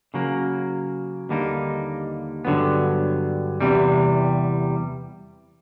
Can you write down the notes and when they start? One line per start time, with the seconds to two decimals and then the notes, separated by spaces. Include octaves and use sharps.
0.14 C#3 F#3 A#3
1.29 D#2 D3 G3 A#3 D#4
2.45 G2 D3 F#3 B3
3.61 E2 C3 E3 G3